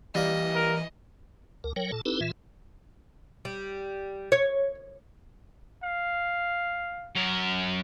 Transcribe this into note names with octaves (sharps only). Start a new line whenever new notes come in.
E3 G3 A#3 D#5
A#4
D2 A#4
F#3 A#4 C#5 G5
A#2 A4 A5
C4 D#4 E4 G4 A4 B4
A#2 E3 F4 E5
G3
C#5
F5
F#2 A#4